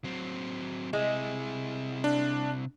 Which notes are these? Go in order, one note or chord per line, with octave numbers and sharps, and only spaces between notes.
F#3 C4
C3 G#3 E4
D4